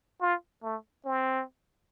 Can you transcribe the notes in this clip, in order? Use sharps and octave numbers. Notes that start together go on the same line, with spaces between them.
F4
A3
C4